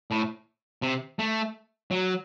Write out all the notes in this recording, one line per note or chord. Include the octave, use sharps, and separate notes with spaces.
A2
C3
A3
F#3